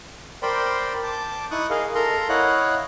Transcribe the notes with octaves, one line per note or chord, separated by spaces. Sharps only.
A#4 C5 D5 G5 B5 C6
A5 D6 G6
D#4 E4 C#6 D#6 F#6
G#4 A#4 D#5 F5
A4 A#4 A#5 C6
E4 C#5 D#5 F5 F#5 F#6